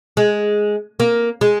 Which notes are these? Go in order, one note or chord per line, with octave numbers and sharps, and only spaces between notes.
G#3
A#3
G#3